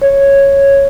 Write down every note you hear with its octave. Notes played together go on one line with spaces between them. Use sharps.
C#5